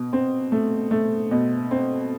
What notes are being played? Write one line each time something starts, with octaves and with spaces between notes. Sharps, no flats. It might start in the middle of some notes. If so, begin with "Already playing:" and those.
Already playing: B2
C4
A3
A3
B2
C4